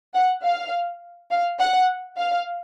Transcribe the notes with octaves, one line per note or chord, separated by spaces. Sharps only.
F#5
F5
F5
F#5
F5